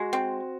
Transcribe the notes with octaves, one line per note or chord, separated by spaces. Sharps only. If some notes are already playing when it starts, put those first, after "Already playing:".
Already playing: G#3 F#4
C4